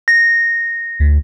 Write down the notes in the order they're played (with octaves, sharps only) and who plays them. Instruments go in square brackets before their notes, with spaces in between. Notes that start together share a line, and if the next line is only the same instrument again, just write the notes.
[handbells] A#6
[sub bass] D2